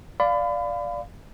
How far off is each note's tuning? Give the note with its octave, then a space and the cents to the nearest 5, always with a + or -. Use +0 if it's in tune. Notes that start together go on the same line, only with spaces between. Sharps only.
D5 +0 F5 +0 B5 +35